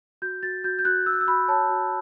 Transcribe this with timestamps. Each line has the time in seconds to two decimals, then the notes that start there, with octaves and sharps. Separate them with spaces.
0.22 F#4 G6
0.43 F#4 A6
0.64 F#4 G6
0.79 G6
0.85 F#4 F#6
1.06 F#4 E6
1.13 F#6
1.21 E6
1.27 F#4 B5
1.48 C#5 A5
1.69 F#4